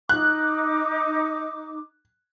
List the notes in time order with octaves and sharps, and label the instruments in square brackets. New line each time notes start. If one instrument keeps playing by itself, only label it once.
[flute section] D#4 D6 [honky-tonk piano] F#6